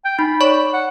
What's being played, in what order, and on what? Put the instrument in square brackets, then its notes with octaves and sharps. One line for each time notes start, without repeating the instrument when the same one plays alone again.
[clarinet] G5
[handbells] D#4 [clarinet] B5
[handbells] C#5 B5 C#6 [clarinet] D5
[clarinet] F#5